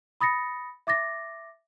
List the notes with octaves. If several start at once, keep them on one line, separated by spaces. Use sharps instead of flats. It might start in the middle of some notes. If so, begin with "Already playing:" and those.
B5 D#6 A6 A#6 C#7
E5 D6 A6 A#6